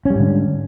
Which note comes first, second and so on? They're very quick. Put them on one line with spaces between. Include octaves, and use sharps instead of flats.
C#4 G3 G#2 D3